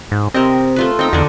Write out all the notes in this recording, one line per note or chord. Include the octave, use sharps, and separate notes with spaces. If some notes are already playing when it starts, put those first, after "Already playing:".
G#2
C3 C4 A#4 D#5
A3 F4 B4
C4 D#4 G5 A#5
E2 D3 D4